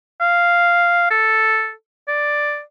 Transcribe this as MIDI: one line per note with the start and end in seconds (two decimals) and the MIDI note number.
0.21 1.06 77
1.11 1.72 69
2.08 2.61 74